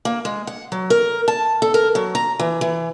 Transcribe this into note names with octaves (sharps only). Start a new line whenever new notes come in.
A#3
G#3
F#5
F#3
A#4
A5
A4
A#4
F#3
A#5
E3
E3